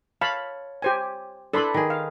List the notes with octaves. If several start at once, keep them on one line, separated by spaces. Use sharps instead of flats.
C#5 F5 A5 B5
G4 C5 G#5
D4 E4 A4 B4 B5 C6
D#3 G#4
F5